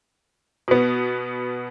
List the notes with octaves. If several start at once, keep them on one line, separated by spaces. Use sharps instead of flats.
B2 B3